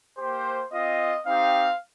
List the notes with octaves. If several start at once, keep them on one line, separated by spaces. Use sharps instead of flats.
A#3 G4 C5
C4 F4 D#5
C4 D#4 G4 F5